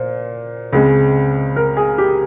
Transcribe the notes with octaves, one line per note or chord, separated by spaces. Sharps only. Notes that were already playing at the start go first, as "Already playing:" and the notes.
Already playing: A#2 C5
C#2 C#3 G#3 C4
A#4
G#4
G4